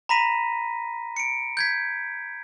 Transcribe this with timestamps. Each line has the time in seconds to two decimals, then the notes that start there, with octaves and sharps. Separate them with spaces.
0.09 A#5 B5 A#6 B6 D#7
1.17 C#7 D7
1.57 G6 G#6 B6